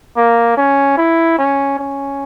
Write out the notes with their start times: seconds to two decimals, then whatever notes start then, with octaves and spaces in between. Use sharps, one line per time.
0.17 A#3
0.57 C#4
0.98 E4
1.38 C#4
1.79 C#4